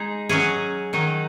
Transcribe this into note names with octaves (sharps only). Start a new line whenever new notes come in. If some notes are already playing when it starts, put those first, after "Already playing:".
Already playing: G#3 D#4 G#4
F#3 C#4 G#4
D#3 F#3 D#4